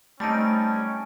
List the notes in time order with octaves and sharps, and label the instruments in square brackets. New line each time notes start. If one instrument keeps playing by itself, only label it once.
[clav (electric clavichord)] G3 C4 D#4 [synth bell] A3 A5 D7 [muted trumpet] C#4